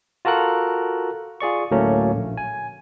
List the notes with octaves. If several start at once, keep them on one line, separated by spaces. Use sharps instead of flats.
F4 F#4 A4 A#4 F#6
F4 G#4 D5 C#6
D2 A2 F#3 A3 A#3 C#4
A#1
G#5